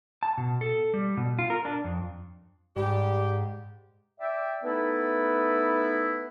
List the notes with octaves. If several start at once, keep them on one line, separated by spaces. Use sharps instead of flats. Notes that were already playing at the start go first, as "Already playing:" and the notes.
A5
B2
A4
G3
B2
F4
A#4
D4
F2
G#2 G3 G4
D5 E5 G5
A3 B3 D#4 E4 A4 B4